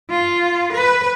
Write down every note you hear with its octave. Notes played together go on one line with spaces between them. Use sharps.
F4
B4